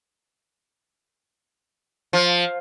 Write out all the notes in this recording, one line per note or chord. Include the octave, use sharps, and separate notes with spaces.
F3